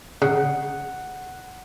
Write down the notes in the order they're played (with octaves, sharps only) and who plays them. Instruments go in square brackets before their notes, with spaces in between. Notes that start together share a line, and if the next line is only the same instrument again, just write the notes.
[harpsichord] C#3 [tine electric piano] F#5